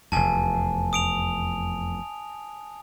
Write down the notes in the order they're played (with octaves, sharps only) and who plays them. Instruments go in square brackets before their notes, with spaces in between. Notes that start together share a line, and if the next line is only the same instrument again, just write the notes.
[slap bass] F1 E2 [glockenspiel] G#5 A5
[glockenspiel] D#6 D7 F7